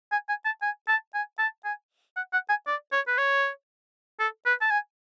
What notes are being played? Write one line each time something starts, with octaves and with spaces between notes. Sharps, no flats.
G#5
G#5
A5
G#5
A5
G#5
A5
G#5
F#5
F#5
G#5
D5
C#5
B4
C#5
A4
B4
A5
G#5